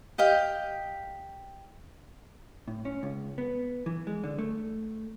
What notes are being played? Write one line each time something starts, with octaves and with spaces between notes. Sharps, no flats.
G4 D#5 F5 G5
A2
C#4
C#2
B3
E3
G#3
D3
A3